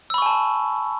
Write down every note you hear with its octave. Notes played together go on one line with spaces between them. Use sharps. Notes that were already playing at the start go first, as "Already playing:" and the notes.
G#5 A5 B5 C#6 E6